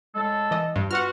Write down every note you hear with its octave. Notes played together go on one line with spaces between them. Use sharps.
A2 G#3 A4
E3 D#5
G2
B3 F4 F#4 F#5 F6